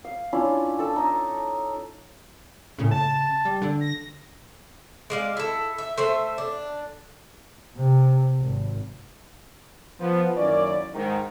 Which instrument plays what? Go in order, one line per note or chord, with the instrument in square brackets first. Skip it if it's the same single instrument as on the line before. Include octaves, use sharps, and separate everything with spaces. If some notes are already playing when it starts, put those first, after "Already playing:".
[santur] F5
C#4 D4 E4 F4
A4 A5 E6
D#4 D#5
[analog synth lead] A2 [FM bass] C#3
[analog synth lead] A5
[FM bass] G3
D3
[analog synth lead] A#6
[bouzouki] G#3 D5 F5
E4 A4
E5
A3 C5 E5
D4
[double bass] C3
G#1
[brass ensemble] F3 B3
F#2 D#3 A#3 C#4 E4 D5
G#2 D#3